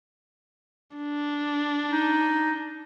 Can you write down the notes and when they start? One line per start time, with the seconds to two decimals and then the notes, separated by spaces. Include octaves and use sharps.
0.97 D4
1.91 D#4